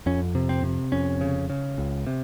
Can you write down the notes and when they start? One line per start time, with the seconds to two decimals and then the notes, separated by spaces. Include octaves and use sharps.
0.06 F2 C#4
0.35 C3
0.49 C4
0.64 C3
0.92 F2 C#4
1.21 C#3
1.50 C#3
1.78 C#2
2.07 C3